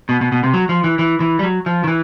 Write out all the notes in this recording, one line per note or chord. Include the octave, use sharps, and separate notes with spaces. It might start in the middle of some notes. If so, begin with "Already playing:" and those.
B2
B2
B2
C3
F#3
F3
E3
E3
E3
G3
F#3
F3
D#3
E3